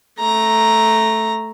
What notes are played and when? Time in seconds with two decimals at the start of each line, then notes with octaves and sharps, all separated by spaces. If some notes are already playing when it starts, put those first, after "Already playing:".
0.20 A3 A#5